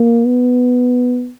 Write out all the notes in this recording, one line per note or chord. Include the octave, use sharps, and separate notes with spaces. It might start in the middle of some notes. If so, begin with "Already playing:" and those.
Already playing: A#3
B3